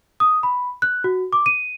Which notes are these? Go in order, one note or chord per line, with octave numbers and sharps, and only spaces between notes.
D#6
B5
F#6
F#4
D6
D#7